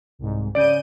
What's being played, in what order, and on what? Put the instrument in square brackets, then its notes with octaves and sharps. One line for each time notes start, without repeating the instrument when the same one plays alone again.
[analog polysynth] C2 G#2
[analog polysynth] C#3 G6 D#7 [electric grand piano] D5 D7